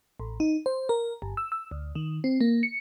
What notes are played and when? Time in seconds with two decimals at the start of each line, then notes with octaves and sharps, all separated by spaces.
0.20 A1
0.40 D#4
0.66 C5
0.89 A#4
1.22 G1
1.37 E6
1.52 E6
1.71 D2
1.95 D#3
2.24 C4
2.41 A#3
2.63 C#7